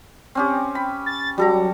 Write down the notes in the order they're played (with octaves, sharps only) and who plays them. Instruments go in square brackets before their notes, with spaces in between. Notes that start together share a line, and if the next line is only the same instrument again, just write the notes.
[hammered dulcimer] C4 C#4 G4
B5
[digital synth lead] A6
[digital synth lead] F#3 [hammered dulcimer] G3 A4 A#5